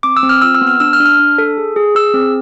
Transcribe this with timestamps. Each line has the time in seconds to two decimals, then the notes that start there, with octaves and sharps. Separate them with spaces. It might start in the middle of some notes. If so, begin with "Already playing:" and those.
0.03 C4 D6
0.17 E6
0.23 C4
0.29 F6
0.42 F4 E6
0.55 E6
0.61 B3
0.67 F6
0.80 D4 E6
0.93 F6
1.00 D4
1.06 F6
1.19 D4
1.38 A4
1.57 G#4
1.76 G#4
1.95 G#4 E6
2.14 C4